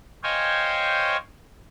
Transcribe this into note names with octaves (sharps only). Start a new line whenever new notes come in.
C5 C#5 D#5 F5 G5 G#5